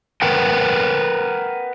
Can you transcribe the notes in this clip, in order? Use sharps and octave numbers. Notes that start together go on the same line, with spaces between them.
A#4 B4 F#5 G5